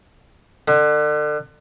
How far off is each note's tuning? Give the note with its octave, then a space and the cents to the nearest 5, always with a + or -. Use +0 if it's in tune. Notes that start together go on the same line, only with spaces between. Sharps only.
D3 +35